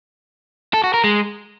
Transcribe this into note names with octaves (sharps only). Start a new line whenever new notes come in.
A4
F#4
A#4
G#3